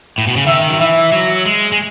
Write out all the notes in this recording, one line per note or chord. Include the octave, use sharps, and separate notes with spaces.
A2
B2
C#3
D#3 E5
F#3
E3 E5
F#3
G#3
G#3